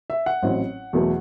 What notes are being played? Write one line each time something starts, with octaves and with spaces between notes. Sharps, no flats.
E5
F#5
A1 A2 F#3 C4 E4
E2 B2 F#3 A3